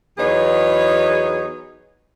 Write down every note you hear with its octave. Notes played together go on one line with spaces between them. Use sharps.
E2 F#3 B3 D#4 G#4 C#5